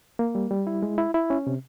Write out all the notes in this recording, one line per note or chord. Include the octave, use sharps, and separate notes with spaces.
A#3
G3
G3
E4
G#3
E4
E4
C#4
C3